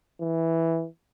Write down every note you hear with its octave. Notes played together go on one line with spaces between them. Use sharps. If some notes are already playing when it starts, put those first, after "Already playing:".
E3